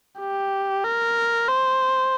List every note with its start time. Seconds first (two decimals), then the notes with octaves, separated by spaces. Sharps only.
0.20 G4
0.84 A#4
1.48 C5